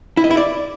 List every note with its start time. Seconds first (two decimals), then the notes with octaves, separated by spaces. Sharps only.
0.17 E4
0.24 D#5
0.31 E4
0.37 D5